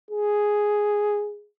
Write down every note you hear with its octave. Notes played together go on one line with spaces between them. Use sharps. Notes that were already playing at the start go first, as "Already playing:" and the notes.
G#4